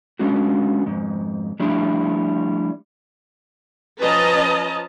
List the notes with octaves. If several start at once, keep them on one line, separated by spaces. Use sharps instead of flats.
G#3 B3 C#4 D4 F#4
F2 G#2
F3 G3 A3 D4 E4
F3 C#4 B4 D#5 A5 A#5